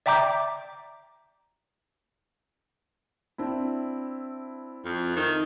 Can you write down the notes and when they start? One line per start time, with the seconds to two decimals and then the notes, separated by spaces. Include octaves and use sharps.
0.06 D5 E5 G5 A#5 D6 G6
3.38 C4 D4 E4
4.85 F2
5.16 D#3